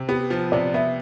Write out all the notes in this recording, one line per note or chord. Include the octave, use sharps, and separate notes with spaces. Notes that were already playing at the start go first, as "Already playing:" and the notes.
Already playing: C3
B3 G4
F3
C3 D5
B3 E5